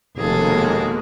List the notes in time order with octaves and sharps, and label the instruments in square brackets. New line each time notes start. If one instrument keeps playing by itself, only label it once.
[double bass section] F1 [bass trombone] D#2 [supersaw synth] B2 G#3 A#3 [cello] G#4 A4